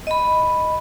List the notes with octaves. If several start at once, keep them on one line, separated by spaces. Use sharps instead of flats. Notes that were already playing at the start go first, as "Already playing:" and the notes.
D#5 B5